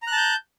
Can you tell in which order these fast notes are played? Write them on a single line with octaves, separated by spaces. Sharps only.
A#5 F#6 A5 G6